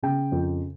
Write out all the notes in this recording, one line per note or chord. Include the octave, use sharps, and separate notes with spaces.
C#3 G5
F2